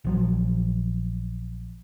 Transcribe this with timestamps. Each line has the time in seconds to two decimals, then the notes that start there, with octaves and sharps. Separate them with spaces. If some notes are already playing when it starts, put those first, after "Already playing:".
0.04 A#1 F3 F#3